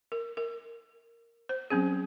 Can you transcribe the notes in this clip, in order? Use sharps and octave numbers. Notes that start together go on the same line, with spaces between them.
A#4
A#4
C5
F#3 C4 C#4 G#4